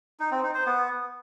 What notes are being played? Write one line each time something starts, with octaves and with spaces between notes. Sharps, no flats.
D#4
C4
D#4
C5
B3